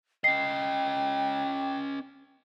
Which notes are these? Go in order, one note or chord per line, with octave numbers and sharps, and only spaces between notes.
C#4 D#5 G5 C7